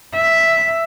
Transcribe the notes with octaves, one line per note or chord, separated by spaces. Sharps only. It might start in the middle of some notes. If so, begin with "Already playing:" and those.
E5